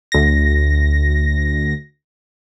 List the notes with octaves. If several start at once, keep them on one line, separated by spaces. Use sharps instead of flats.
D2 A#6